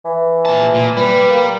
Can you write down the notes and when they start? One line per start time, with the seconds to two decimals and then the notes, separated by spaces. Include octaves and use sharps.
0.05 E3
0.45 A#2 A5
0.74 A#2
0.97 G3 B4
1.30 A#3